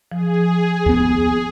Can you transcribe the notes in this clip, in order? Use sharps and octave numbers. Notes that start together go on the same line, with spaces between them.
F3 G#4
D#2 B3